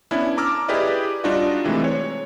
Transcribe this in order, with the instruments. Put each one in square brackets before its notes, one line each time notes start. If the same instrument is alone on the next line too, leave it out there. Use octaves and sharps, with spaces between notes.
[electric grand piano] B3 C#4 D4 E4
A5 A#5 D6 E6 F6
E4 G4 G#4 B4 D5 D#5
G3 D4 D#4 F4 F#4 D#5
C3 E3 G#3 A3 C4
C#5